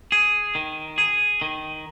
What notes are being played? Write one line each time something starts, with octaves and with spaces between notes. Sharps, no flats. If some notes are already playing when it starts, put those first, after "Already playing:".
G#4
D#3
G#4
D#3